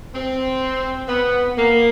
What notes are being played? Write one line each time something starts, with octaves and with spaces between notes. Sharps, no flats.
C4
B3
A#3